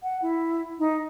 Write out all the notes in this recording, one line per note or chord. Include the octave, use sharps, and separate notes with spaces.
F#5
E4
D#4